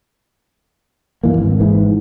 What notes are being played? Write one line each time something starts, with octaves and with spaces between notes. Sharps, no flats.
G2 E3 A#3
G#1
G#2 E3